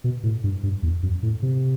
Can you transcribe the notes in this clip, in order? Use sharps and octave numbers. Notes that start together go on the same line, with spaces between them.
B2
A2
G2
G2
E2
F#2
A2
C3